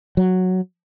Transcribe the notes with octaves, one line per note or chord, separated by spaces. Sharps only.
F#3